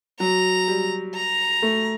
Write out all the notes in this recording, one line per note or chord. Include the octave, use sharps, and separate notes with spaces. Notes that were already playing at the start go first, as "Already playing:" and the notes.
F#3 A#5
G3
A#5
A3